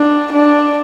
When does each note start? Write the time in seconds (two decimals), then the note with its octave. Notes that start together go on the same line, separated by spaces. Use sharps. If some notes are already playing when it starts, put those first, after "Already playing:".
Already playing: D4
0.33 D4